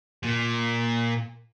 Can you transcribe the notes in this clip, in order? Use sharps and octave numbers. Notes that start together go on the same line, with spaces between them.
A#2